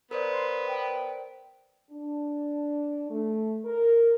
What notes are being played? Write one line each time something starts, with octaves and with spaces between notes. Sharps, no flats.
B3 A#4 C5 D5
C6
G5
D4
A3
A#4